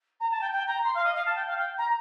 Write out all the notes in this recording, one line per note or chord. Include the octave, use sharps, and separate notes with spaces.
A#5
A5
G5
G5
A#5
C6
F5
D#5
F5
A5
G5
F5
G5
A#5